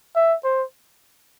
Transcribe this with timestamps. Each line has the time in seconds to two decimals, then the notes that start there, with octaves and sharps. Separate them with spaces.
0.16 E5
0.44 C5